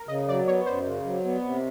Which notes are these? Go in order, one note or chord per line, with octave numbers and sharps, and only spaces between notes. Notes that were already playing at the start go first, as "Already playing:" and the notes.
Already playing: A#4
C#3 D#5
F#3 D5
B3 C#5
F#2 C5
C#3
F#3
B3
C3